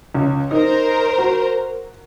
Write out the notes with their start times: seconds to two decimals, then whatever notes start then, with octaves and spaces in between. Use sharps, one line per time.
0.15 C#2
0.51 D#4 A#4 C5 A#5
1.18 F#4